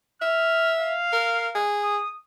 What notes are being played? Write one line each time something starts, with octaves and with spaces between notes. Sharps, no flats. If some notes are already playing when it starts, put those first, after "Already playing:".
E5 F6
F5
A#4
G#4
D#6